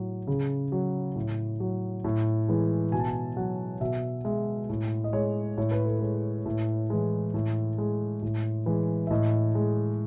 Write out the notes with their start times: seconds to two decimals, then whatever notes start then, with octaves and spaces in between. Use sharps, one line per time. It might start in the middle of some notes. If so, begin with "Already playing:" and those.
Already playing: A2 F#3
0.27 C#3
0.72 F#3
1.16 A2
1.60 F#3
2.04 A2
2.48 E3 G#3
2.92 B2 G#5
3.00 A5
3.07 G#5
3.37 F#3 F#5
3.81 B2 E5
4.25 G#3 E5
4.69 A2
5.04 D#5
5.13 G#3 C#5
5.58 A2 C#5
5.71 B4
5.85 A4
5.99 G#3 B4
6.46 A2
6.90 E3 G#3
7.34 A2
7.78 G#3
8.22 A2
8.66 E3 G#3
9.07 E5
9.11 A2 D#5
9.55 G#3